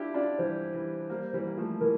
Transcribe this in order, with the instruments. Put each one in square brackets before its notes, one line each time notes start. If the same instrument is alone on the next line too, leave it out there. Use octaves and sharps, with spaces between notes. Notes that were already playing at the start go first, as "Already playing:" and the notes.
Already playing: [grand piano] D4 E4 F4 G4
[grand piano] D4 F4 [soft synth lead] D5
[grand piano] E3 G3 [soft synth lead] C5
[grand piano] E3 G3
G3 A#3
E3 G3
A#3
F3 A3
[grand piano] E3 G3 [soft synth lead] A#4